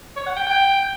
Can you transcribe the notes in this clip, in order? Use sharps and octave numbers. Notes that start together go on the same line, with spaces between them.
C#5
F#5
G5
G5